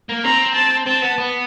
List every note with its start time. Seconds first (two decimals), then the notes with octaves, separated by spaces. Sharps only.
0.09 A#3
0.25 C4 A#5
0.55 A5
0.87 C4 A5
1.03 B3
1.18 B3